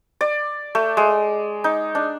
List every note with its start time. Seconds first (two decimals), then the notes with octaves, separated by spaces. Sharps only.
0.21 D5
0.75 A3
0.97 G#3
1.64 D#4
1.95 D4